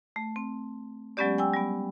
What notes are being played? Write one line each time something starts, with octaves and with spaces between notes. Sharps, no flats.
A3
C4
F#3 G#3 B3 C#4 G4 D5
G5 G#5 E6
G3 B3